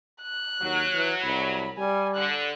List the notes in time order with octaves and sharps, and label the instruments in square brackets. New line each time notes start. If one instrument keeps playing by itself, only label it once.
[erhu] F#6
[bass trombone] D#2 [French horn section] F#3
[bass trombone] E3
[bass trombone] C2 [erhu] B5
[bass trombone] G3 [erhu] G#5
[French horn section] D3 [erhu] F#6